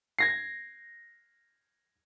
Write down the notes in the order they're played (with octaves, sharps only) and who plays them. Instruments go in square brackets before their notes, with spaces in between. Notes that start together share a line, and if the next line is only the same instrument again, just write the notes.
[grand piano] G#6 A#6 C7